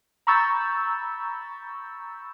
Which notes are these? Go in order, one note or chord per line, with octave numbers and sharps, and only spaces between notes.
A#5 B5 C#6 E6 G6 A6